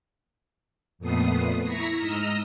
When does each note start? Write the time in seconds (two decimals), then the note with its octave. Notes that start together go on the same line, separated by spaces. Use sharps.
0.98 F2 A#2 A3 B3 D#6 C7
1.64 E4 A#5 C#6 A#6 B6
1.96 G#2 D#5 A#5 E6 F6